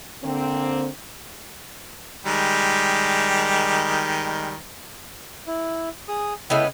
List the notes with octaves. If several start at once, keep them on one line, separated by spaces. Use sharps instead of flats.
D3 A#3 C4
D#3 G3 G#3
E4
G#4 D#6
C#3 G#3 B3 E4 A4 G5